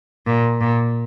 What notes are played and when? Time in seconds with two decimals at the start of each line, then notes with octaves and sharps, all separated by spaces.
0.27 A#2
0.61 A#2